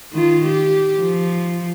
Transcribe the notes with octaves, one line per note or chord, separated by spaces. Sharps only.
D#3 F4
G4
F3